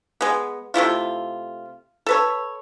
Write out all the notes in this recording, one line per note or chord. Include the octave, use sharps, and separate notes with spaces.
G#3 B3
C3 A3 E4 F4
A4 B4 C#5